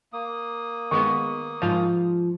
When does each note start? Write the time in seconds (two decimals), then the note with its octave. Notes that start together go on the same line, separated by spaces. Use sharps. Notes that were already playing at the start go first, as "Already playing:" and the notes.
0.13 A#3 D#6
0.91 D#3 G#3 B3 C#6
1.62 G#2 F3 F4